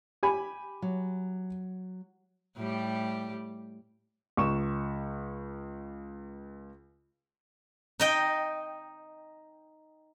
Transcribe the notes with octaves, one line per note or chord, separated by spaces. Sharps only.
G4 G#5 B5
F#3
A2 G3 G4
C#2 C#6 E7
D#4 D#5 G5